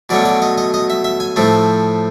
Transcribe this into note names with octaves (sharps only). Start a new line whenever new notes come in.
B2 F#3 A3 C#4 D5
D5
D#5
D#5
D#5
E5
E5
G#5
A2 F3 A3 C4